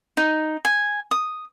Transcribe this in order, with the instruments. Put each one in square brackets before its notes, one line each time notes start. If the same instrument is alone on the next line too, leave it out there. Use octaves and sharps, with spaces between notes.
[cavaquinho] D#4
G#5
D#6